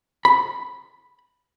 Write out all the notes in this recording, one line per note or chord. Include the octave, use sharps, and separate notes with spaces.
B5